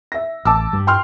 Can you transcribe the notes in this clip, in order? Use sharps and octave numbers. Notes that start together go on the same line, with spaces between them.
E5 A#6
A1 A5 D6 E6
G2 G3
G5 C6 F6